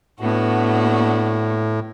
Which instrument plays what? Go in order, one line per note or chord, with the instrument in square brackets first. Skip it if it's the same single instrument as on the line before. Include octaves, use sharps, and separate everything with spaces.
[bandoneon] A2 [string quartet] B3 D4 F#4